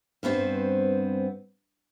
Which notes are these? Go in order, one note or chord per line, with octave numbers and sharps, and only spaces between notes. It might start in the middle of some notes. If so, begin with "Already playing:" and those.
G2 B3 C4 F4 C5